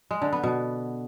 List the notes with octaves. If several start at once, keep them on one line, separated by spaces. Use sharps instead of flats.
G#3
D3
B3
B2